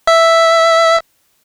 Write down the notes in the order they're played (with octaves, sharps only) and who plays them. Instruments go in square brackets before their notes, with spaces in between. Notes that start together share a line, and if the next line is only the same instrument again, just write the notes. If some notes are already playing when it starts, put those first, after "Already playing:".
[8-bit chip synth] E5